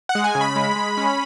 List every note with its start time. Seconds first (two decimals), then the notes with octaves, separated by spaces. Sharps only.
0.09 F#5
0.15 G#3
0.24 G#5
0.35 C#3
0.41 B5
0.56 G#3
0.76 G#3
0.97 C#4